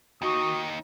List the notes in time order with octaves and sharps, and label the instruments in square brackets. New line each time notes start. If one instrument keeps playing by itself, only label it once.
[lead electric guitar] D#2 D#4 [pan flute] F#4 [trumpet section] D#6